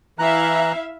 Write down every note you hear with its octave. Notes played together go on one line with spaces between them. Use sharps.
E3 E4 E5 F5 A#5 F#6